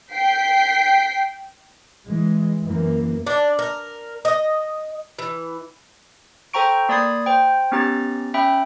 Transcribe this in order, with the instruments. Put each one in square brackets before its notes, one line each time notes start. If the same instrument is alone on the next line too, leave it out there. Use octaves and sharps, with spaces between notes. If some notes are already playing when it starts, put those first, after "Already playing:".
[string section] G5 B6 C7
[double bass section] E3 G#3
F#2 E3 A#3
[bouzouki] D4
A#4
D#5
E3
[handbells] A4 C5 G5 A#5 C#6 D7
A#3 D5 B5 D#6 G#6 C7
C5 G5
B3 C#4 D#4 G4 A#5 A6
C#4 E5 G5 B5